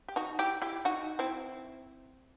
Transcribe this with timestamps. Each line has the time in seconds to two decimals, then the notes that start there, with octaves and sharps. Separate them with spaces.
0.08 G4
0.16 D#4 F#4
0.39 E4 G4
0.62 E4 G4
0.85 D#4 F#4
1.19 C4 E4